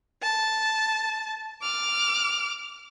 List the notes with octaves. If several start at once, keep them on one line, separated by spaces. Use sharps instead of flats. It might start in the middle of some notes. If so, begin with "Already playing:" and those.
A5
D6 F6